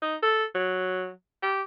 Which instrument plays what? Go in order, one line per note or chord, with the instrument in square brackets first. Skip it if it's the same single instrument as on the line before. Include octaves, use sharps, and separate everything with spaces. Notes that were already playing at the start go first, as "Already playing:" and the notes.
[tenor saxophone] D#4
A4
F#3
G4